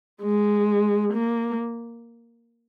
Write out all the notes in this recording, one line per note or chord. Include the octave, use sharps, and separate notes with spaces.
G#3
A#3